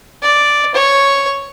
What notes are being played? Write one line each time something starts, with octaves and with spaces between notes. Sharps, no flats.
D5
C#5